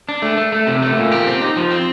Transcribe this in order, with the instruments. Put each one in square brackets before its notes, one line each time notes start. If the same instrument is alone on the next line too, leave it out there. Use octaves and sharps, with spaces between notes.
[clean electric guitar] D4
A3
A3
A3
C3
A3
A#2
G4
C4
D#4
F3
C4